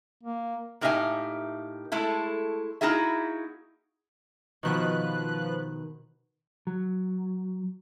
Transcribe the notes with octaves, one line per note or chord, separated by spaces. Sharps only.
A#3
A2 A#3 D#4 G4 E5 G#5
G#3 A3 E4 A4
A#3 D#4 E4 F#4 G#4 E5
B2 D#3 F3 B4 F#6
F#3